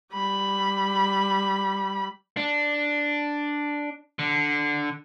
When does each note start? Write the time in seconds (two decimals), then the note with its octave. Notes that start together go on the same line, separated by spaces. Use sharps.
0.13 G3 B5
2.37 D4
4.19 D3